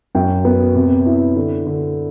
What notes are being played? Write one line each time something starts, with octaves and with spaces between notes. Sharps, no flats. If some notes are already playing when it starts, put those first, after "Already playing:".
F#2 G5
B3
C3
E4
D3
D3